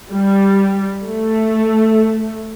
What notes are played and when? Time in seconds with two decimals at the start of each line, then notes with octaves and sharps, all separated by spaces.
0.12 G3
1.04 A3